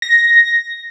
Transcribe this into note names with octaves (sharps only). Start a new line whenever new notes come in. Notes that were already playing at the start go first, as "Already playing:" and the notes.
A#6